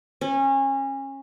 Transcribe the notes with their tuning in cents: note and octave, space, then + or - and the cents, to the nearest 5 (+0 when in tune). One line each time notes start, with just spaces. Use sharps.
C#4 -25